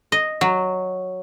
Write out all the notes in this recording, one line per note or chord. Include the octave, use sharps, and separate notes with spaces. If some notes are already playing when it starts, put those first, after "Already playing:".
D#5
F#3